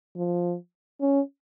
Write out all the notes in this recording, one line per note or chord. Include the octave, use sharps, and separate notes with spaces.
F3
C#4